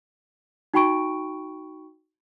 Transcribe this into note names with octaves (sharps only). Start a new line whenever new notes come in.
D#4 F#4 G5 B5 C#6 D7